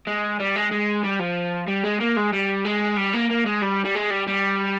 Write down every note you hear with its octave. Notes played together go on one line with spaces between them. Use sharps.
G#3
G3
G#3
G#3
G3
F3
G3
G#3
A#3
G#3
G3
G#3
G3
A#3
A#3
G#3
G3
G3
G#3
G3
G3